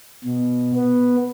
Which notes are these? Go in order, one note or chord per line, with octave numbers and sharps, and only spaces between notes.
B2
B3